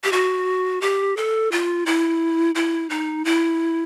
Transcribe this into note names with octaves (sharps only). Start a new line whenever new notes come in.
G4
F#4
G4
A4
F4
E4
E4
D#4
E4